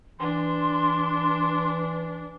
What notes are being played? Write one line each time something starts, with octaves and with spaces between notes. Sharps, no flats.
E3 D4 C6